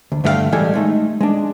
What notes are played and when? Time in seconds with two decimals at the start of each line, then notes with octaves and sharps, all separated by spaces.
0.12 D2
0.24 G2 D3 A3 F4 F5 G5
0.52 A2 E3 G3 G#3 A4 G#5
0.74 G#3 A3 D#4
1.21 G#3 D4